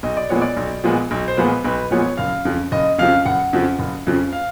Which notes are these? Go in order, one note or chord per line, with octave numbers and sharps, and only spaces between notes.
B1 D#5
D5
A#2 F3 G#3 B3 C#5
D5
B1
A#2 F3 G#3 B3
B1
C5
A#2 F3 G#3 B3 B4
B1 B4
A#2 F3 G#3 B3 C#5
F#1 F5
F2 C#3 F3
F#1 D#5
F2 C#3 F3 F5
F#1 F#5
F2 C#3 F3
F#1
F2 C#3 F3
F5